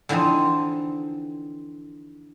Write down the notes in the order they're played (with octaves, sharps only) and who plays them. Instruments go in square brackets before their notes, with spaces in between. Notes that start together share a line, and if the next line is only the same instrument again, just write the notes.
[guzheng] D3 E3 F3 C4 D#4